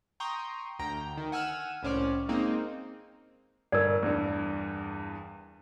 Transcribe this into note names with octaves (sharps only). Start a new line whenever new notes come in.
G5 A#5 C6 C#6 D#6
D2 G5 A#5
D#3
F#5 G#5 E6 F6 D#7 E7
C2 A2 C#4 C5 D5 F6
G#3 A#3 C4 D#4
G1 A#4 D5
E2 G2